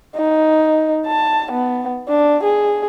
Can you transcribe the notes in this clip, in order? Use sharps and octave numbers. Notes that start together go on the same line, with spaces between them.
D#4
A5
B3
D4
G#4